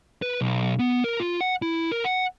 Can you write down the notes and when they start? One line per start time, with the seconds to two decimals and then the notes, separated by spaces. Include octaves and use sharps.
0.22 B4
0.41 B1
0.79 B3
1.04 A#4
1.20 F4
1.41 F#5
1.62 E4
1.92 A#4
2.05 F#5